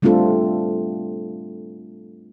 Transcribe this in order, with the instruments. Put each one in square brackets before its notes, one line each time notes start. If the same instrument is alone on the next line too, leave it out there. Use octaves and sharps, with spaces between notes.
[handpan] G3 A3 C4 D4 F4 A4